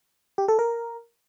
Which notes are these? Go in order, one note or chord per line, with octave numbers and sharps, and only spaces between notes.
G4
A4
A#4